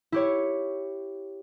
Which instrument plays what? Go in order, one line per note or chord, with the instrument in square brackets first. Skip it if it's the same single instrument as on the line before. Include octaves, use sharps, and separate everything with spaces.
[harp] E4 G4 C#5